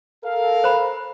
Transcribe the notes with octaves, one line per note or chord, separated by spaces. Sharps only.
A4 A#4 F5
C5 B5